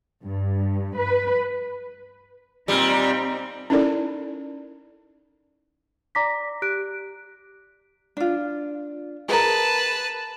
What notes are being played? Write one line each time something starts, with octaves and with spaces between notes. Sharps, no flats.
G2
B4
A#2 G3 C4 D#4
C#4 D#4 E4 A4 A#4 D5
D5 A#5 D6 A#6 B6
G4 F#6 D7
D4 F4
G#4 A#4 B4 A5